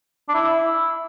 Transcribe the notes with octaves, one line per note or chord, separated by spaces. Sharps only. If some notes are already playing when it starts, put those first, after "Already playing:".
D4
E4